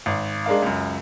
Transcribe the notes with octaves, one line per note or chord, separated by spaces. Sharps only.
G#1
G#3 D4 A#4 F5
C#2 F#2